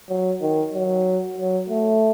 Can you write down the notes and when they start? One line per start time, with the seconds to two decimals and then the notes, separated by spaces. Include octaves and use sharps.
0.09 F#3
0.42 D#3
0.74 F#3
1.38 F#3
1.70 A3